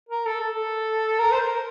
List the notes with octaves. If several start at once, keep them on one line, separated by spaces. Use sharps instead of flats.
A#4
A4
A4
A#4
C5
A#4